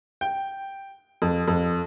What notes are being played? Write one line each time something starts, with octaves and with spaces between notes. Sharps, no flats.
G5
F2
F2